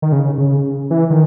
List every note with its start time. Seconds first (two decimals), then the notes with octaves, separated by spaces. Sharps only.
0.02 D#3
0.12 C#3
0.38 C#3
0.90 E3
1.10 D#3